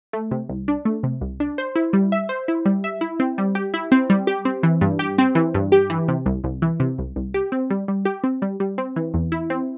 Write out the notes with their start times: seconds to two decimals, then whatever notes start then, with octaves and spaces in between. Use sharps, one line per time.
0.13 A3
0.31 C3
0.49 C2
0.68 D4
0.85 A3
1.03 C3
1.21 C2
1.40 D4
1.58 C5
1.75 E4
1.93 G3
2.12 E5
2.29 C5
2.48 E4
2.66 G3
2.84 E5
3.01 E4
3.20 C4
3.38 G3
3.55 G4
3.74 E4
3.92 C4
4.10 G3
4.27 G4
4.45 C4
4.63 E3
4.81 G2
4.99 G4
5.18 C4
5.35 E3
5.54 G2
5.72 G4
5.90 E3
6.08 C3
6.26 C2
6.44 C2
6.62 E3
6.80 C3
6.98 C2
7.16 C2
7.34 G4
7.52 C4
7.70 G3
7.88 G3
8.05 G4
8.24 C4
8.42 G3
8.60 G3
8.78 C4
8.96 E3
9.14 E2
9.32 E4
9.50 C4